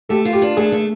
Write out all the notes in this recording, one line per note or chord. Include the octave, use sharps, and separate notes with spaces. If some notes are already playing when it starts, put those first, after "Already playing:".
A3 G4 A4
F4
G4
D4
A3 G#4
A3